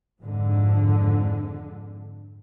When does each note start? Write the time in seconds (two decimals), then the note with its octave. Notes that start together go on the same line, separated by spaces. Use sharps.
0.21 F2 G#2 D3